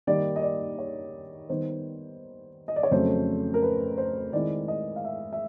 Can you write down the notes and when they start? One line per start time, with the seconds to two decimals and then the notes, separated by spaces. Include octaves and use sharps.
0.07 D#3 G3 A#3 D#4 D5
0.36 D#5
0.42 D5
0.79 C#5
1.49 D#3 G3 B3 D#4 C5
2.68 D#5
2.76 D5
2.83 C#5
2.91 F2 C#3 F#3 A3 C5
3.54 A#4
3.62 B4
3.98 C5
4.33 D#3 G#3 C4 E4 D5
4.68 D#5
4.96 F5
5.05 E5
5.33 E5